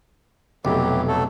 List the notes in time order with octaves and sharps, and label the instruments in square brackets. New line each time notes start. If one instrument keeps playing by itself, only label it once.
[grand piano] F1 [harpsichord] B1 [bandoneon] E3 F#3 G4
[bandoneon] F#3 A3 A4